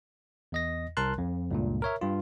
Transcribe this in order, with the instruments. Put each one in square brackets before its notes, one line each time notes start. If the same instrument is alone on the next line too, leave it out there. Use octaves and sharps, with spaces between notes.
[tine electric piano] E2 D#5 A#6
C2 A#4 A5 C6 F#6
F2
C#2 G2 A#2
A#4 C#5 E5
G2 F4